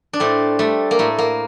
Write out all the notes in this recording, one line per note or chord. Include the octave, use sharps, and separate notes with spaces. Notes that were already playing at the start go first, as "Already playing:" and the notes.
D4
A2 A3 C4
G3 A3
A#3
A2 A3
A#3